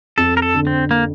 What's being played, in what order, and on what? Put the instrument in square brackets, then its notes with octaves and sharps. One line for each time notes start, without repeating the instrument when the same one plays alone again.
[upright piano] F2 [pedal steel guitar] A4
[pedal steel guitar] A#4
A4
[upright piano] D3
[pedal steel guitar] C4
A#3